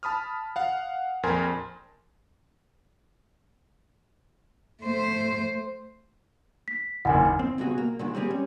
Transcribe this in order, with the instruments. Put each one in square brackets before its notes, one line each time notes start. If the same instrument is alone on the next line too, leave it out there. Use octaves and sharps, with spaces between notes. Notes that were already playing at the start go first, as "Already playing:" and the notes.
[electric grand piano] A5 B5 D#6 F6
F5 F#5
A#1 F2 A#4 G#5 C6
[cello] A3 C5
[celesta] B6
[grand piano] F#1 D#2 [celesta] F#5 G#5
[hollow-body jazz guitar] C4
C#2 G2 B2 F#4 G#4
A#3
A#2 D3 D#3 G#3
G3 A#3 C4 G4 G#4
G3 C#4